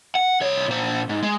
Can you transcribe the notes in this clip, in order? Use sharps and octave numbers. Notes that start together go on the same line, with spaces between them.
F#5
C2 C#5
A#2 C5
G#2
G#3